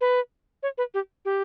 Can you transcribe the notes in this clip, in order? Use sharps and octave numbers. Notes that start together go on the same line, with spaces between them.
B4
C#5
B4
G4
G4